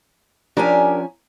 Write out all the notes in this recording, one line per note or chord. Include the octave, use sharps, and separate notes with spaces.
F3 C#4 D4 G4 A#4 G#5